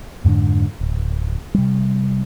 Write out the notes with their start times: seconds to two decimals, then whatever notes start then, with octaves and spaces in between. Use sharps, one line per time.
0.24 F2 G#2 D3 D4
0.81 D1
1.54 C3 G3